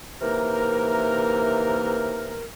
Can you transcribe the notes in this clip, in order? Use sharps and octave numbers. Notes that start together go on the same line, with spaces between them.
C3 E3 A#3 D#4 A#4